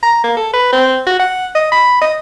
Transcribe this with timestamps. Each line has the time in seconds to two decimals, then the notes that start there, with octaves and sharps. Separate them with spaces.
0.03 A#5
0.24 A#3
0.37 A4
0.53 B4
0.73 C4
1.06 F#4
1.19 F#5
1.55 D#5
1.72 B5
2.01 D#5